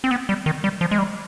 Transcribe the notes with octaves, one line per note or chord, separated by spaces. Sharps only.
C4
B3
G3
D#3
G3
F3
G#3
G3